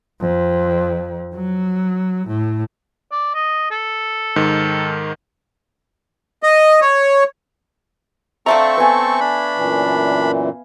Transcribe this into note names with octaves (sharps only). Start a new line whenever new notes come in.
F2
F#3
A2
D5
D#5
A4
G#2 D#3
D#5
C#5
D3 A3 C4 A4 E5 F5 A#5 C#6
B3 G#5
D4 B5
F#2 A#2 E3